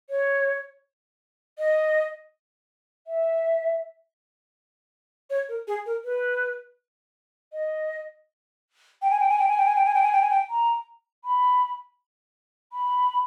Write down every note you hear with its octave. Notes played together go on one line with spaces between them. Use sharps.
C#5
D#5
E5
C#5
A#4
G#4
A#4
B4
D#5
G5
G#5
G5
G#5
G5
G#5
G5
G#5
G5
G#5
G5
G#5
G5
G#5
G5
A#5
B5
B5